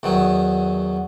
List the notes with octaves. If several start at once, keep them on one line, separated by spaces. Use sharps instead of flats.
E2 D#3 F#3